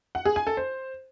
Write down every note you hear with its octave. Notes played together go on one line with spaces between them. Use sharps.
F#5
G#4
G#5
A4
C5